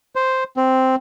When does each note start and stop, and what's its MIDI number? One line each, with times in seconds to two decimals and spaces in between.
0.16 0.44 72
0.57 0.95 60